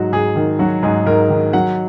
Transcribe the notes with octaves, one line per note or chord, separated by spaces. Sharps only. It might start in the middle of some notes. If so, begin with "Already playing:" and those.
Already playing: G#2 F#3 F#4
G#2 G#4
D#3
F#3 F#4
G#2 G#4
G#2 A#4
D#3
F#3 F#5